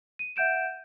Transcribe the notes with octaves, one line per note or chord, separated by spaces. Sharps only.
D#7
E5 F#5 G6 D7 E7